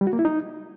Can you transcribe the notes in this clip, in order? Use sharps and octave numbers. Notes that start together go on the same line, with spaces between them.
G3
F#4
A#3
E4
D#4